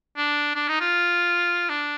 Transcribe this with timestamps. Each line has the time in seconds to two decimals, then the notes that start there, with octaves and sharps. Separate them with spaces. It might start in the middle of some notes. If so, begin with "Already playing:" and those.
0.17 D4
0.56 D4
0.68 D#4
0.81 F4
1.69 D4